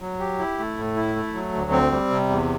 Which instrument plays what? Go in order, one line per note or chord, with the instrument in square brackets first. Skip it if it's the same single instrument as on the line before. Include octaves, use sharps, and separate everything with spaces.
[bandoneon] F#3
G4
E4
A3
A2
E4
A3
F#3
D2
C4
G3
C3
E2